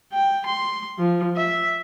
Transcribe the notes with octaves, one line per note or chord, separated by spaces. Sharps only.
G5
C6
F3
E5